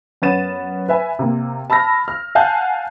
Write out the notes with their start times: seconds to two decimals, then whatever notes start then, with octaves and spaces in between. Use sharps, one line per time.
0.22 F#2 B3 C#4 A6 D#7 E7
0.89 B4 E5 G#5
1.19 C3 A#3
1.70 A5 B5 E6 F6 A#6
2.08 F6
2.35 F5 F#5 G#5 A5 F#6 G6